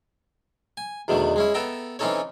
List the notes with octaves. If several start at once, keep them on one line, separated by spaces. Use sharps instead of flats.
G#5
E2 B2 D3 D#3 A3
G#3 C#4 E4
B3 A4 E5 G5 A#5
E3 C4 C#4 D#4 A4 C#5